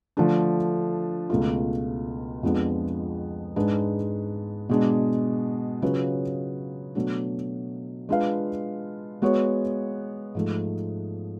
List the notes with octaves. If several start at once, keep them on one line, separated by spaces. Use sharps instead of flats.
D3 F3 A3 D4
C#2 B2 A3 F4
F2 F3 G#3 B3 D4
G#2 G#3 D4 G#4 B4
B2 G#3 D4
C#3 F#3 C#4 F4 B4
B2 F#3 A3 D4 F#4
G#3 D4 F4 B4 F5
G#3 B3 F#4 C#5
G#2 F3 A3